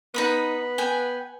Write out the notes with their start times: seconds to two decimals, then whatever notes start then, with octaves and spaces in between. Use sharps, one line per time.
0.14 B3 D#4 B5 D#6
0.78 G5 G#5